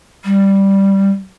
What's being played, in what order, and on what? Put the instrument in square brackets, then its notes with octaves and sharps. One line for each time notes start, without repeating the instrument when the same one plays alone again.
[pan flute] G3